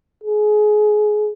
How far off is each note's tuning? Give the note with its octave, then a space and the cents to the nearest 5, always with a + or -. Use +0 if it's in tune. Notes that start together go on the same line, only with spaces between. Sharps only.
G#4 +25